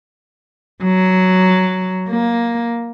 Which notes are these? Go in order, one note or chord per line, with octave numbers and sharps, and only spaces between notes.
F#3
A#3